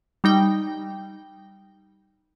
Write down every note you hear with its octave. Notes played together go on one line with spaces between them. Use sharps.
G3 D#4 G5